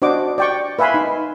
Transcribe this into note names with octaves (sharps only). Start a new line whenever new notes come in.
D4 F#4 C5 D#5 F#5 D6
D5 G5 C#6
B4 E5 F5 G#5 B5 C6
D#4